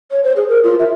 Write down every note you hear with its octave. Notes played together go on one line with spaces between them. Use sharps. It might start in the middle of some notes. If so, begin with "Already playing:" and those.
C#5
C5
G#4
A#4
F4
E5